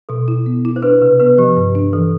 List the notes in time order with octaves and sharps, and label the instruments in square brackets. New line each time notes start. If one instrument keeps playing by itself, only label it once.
[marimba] B2 [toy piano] A4
[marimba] E4
B3
E4
[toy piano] C5
[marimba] D4 [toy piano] B4
[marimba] C3 [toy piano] B4
[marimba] B3 [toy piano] B4
[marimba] F3 [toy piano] G4
[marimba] G2
D4
[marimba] E3 [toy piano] A4